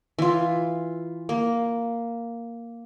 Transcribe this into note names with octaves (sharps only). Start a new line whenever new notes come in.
E3 F4
A#3